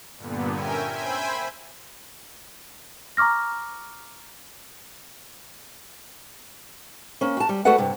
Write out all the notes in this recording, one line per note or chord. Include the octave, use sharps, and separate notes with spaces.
G2 A#2 D3 B3
C#4 A#4 E5 G5 G#5
C5 E5 G5 G#5 B5
A#5 C#6 D6 F6 A#6
A#3 C#4
F#4 A5
G3
A3 F#4 A4 B4 D5 F#5
G2 C3